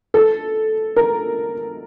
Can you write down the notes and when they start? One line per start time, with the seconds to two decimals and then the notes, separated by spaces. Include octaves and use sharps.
0.14 A4
0.96 A#4